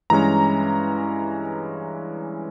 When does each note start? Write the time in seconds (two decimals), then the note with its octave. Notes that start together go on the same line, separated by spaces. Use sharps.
0.10 G2 E3 G#3 C#4 A#5